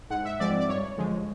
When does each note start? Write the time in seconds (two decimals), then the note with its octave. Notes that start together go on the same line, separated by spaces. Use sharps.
0.10 G#2 F#5
0.25 E5
0.40 F3 G#3 C4 D5
0.59 D5
0.69 G2 C#5
0.97 D3 F3 G#3